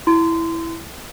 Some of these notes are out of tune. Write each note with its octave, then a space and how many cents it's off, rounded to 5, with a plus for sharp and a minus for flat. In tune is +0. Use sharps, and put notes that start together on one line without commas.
E4 +0 C6 -25